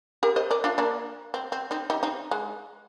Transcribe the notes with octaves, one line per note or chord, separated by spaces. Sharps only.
G4 A#4
C5 D#5
A#4 D5
D4 F4
A#3 D4
C4
C4
C4 D#4
D#4 G4
C4 D#4
G#3